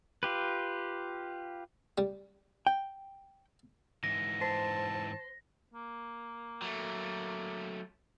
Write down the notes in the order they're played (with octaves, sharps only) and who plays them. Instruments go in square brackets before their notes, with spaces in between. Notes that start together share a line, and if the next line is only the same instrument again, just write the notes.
[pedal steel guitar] F4 G4 B4
[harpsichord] G3
[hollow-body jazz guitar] G5
[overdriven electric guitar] G#2 E3 [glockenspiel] A#6
[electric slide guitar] C5 [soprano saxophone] A5
[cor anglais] A#3
[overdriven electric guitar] F#3 A3